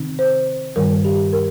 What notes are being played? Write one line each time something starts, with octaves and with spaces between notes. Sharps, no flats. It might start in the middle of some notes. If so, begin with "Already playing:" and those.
Already playing: C3 D#3 C4 D#4
C5
G2 D#3 G3 A#4
G4
A#4